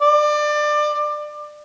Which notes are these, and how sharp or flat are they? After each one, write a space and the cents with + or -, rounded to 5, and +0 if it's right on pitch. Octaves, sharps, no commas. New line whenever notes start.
D5 +25